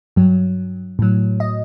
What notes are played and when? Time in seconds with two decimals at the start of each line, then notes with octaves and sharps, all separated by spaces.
0.16 G2 F#3
0.99 A2 F#3
1.40 D#5